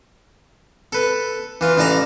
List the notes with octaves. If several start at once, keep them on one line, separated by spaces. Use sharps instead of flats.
A4 B4
E3 F4
A1 E3 D5 A5 A#5 D6